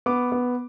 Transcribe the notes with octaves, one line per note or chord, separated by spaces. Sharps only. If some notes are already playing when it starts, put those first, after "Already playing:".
B3 D6
B3